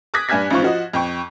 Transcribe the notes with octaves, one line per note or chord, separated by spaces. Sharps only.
D6 D#6 F#6 G#6 A#6 B6
G2 D4 G#5 F#6 G#6 B6
A1 G#2 F3 F4 C5 C#6
F3 F#4 D#5
F2 G5 C#6